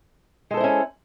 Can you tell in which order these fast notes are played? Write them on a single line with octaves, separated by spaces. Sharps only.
G#3 A4 C5 E4 C#4